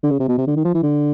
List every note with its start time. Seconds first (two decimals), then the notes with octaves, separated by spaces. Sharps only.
0.03 D3
0.11 C#3
0.20 C3
0.28 B2
0.38 C3
0.47 D3
0.56 D#3
0.65 F3
0.74 E3
0.83 D3